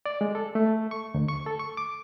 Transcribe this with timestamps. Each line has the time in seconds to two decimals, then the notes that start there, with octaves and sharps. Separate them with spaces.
0.06 D5
0.21 G#3
0.35 A4
0.55 A3
0.91 C#6
1.14 D2
1.28 C#6
1.46 A4
1.59 C#6
1.77 D6